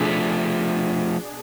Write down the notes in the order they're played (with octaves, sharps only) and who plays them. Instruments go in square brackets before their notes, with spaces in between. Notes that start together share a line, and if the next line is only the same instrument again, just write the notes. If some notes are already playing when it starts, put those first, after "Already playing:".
Already playing: [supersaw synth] B2 D4 G#4 [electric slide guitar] F3 A3